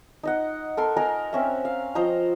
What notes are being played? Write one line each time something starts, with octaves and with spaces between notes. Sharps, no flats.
D#4 D#5 F#5
A4 A#4 C6
A#4 D#5 G#5 A#5
C4 C#4 E5
F5
F3 C5 D#5 A#5